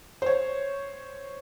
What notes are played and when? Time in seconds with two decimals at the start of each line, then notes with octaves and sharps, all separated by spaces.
0.22 C5 C#5